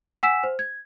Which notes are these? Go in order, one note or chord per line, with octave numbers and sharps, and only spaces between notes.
F#5 G#5 E6 B6 E7
C5
G#6